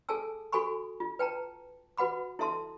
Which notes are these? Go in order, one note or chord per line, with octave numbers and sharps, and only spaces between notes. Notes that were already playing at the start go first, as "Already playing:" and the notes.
G#4 A4 G#5 A5 E6
F#4 A4 G#5 B5 C#6
F4
B4 G5 A5 A#5
F#4 B4 F#5 B5 D6
E4 A4 E5 A5 C6